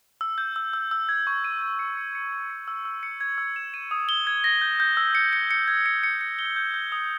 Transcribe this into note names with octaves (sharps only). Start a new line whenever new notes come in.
E6
G6
E6
E6
E6
G#6
C#6
D#7
G6
C#7
C#7
C#7
E6
C#7
E6
E6
C#7
G#6
E6
E7
D#7
D#6
G7
G#6
A#6
G6
G6
E6
C#7
C#7
C#7
G#6
C#7
C#7
C#7
G7
G6
G6
D#6